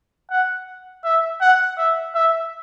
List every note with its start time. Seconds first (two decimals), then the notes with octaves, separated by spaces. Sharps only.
0.31 F#5
1.04 E5
1.41 F#5
1.78 E5
2.15 E5